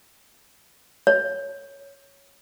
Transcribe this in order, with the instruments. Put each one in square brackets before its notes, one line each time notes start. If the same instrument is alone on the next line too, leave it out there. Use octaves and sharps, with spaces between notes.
[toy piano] C#5